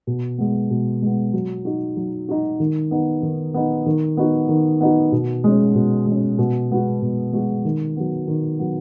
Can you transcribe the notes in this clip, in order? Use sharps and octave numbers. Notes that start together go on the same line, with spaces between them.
B2
G#3 B3
B2
G#3 B3
F#3
D#4 F#4
F#3
D#4 F#4
D#3
B3 D#4
D#3
B3 D#4
D#3
B3 D#4 F#4
D#3
B3 D#4 F#4
B2
G#3 C#4
B2
G#3
C#4
B2
G#3 B3 F#4
B2
G#3 B3 F#4
D#3
F#3 B3
D#3
F#3 B3